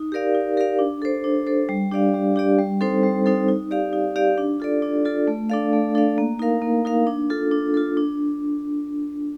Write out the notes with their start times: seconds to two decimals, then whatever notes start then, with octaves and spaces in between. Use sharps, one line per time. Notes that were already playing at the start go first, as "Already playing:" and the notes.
Already playing: D#4
0.12 G4 A#4 D5 F5
0.35 D#4
0.57 G4 A#4 D5 F5
0.79 D4
1.02 A4 C5
1.24 D4
1.47 A4 C5
1.69 G3
1.92 D4 G4 D5 F5
2.14 G3
2.36 D4 G4 D5 F5
2.59 G3
2.81 C4 D#4 A4 C5
3.03 G3
3.26 C4 D#4 A4 C5
3.48 D#4
3.71 G4 D5 F5
3.93 D#4
4.16 G4 D5 F5
4.38 D4
4.60 F4 A4 D5
4.82 D4
5.05 F4 A4 D5
5.27 A3
5.50 D4 A4 D5 F5
5.73 A3
5.95 D4 A4 D5 F5
6.18 A#3
6.39 D#4 A#4 F5
6.62 A#3
6.85 D#4 A#4 F5
7.07 D4
7.30 F4 A4
7.51 D4
7.74 F4 A4
7.97 D4